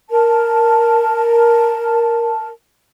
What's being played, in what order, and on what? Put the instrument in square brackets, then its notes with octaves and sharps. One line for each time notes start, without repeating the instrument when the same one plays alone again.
[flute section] A#4 A5